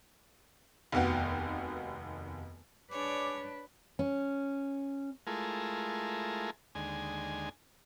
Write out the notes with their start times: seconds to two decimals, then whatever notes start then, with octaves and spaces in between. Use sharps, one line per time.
0.92 F1 D#2 B3 F#4 G5
2.91 D4 G#4 B4 C#5 D5 D6
3.99 C#4
5.27 G#3 A3 E4 F4 G#4 A#4
6.75 D#2 D3 G#3 G#5